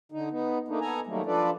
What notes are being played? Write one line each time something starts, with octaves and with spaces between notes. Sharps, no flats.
D3 D#4
B3 D#4
A3 A#3 D4 D#4
B3 A4 G#5 A#5
D#3 F#3 G3 A3 A#3
F3 D4 F4 A4 B4 D5